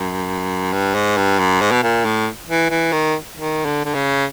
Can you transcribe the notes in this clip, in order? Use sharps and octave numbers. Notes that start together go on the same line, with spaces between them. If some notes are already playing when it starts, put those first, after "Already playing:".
Already playing: F#2
G2
G#2
G2
F#2
G#2
B2
A#2
A2
E3
E3
D#3
D#3
D3
D3
C#3